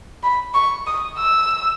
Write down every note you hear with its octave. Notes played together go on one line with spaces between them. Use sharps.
B5
C#6
D#6
E6